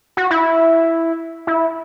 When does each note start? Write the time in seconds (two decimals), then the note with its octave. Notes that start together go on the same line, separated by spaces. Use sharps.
0.17 F#4
0.30 E4
1.47 E4